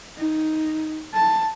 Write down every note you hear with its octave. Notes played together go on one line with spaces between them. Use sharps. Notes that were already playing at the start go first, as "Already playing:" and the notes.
D#4
A5